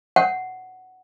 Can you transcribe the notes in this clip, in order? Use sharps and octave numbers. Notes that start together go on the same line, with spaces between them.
F#5